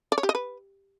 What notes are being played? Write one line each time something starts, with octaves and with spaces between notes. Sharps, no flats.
D5
C#5
G4
D#5
B4